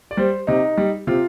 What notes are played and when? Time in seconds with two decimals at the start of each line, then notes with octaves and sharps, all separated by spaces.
0.11 D5
0.17 G3 C5
0.47 C3 D#4
0.77 G3
1.07 C3 F4